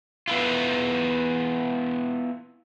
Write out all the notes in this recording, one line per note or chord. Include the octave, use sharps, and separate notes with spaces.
B3 E4 F4